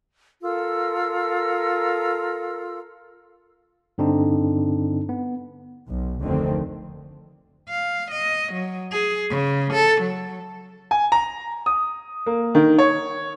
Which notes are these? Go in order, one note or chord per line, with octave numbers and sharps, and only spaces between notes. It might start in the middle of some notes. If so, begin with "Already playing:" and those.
F4 A4 A#4 E6
G2 D3 C4 D4 D#4
B3
B1
F1 D2 D3 D#3 C4
F5
D#5
F#3
G#4
C#3
A4
F#3
G#5
A#5
D#6
A#3
D#3
C#5